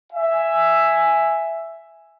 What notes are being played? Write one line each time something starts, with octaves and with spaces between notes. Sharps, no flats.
E5 G#5